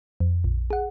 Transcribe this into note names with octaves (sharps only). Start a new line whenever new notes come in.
F2
A#1
G#4 F#5